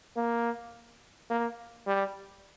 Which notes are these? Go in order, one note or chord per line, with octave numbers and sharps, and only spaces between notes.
A#3
A#3
G3